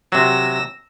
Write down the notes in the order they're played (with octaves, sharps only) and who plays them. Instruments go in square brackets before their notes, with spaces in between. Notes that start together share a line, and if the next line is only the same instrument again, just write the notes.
[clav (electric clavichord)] C3 F#3 [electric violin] E6 A#6